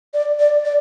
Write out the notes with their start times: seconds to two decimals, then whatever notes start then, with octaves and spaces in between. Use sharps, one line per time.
0.14 D5
0.39 D5
0.65 D5